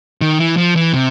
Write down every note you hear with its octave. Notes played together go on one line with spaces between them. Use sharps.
D#3
E3
F3
E3
C3